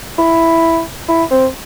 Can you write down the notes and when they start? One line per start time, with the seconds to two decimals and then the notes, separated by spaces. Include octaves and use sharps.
0.19 E4
1.09 E4
1.31 C4